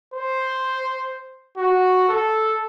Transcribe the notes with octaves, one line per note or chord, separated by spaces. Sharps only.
C5
F#4
A4